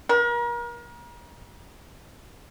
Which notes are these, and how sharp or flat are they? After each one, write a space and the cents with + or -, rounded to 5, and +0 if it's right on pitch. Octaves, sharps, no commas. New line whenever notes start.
A#4 +35